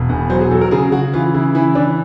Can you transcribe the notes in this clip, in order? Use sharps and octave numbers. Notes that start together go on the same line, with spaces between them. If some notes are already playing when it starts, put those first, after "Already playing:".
Already playing: E1
E2
F#3 C5
G#4
F#3 A4
A#4
C#3 G#4
C#3 F#4
E3 F4
C#3 E4
E3 E4
E3 D4